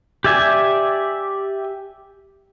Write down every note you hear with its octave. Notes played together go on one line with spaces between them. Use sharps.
G4 D5 E5 G#5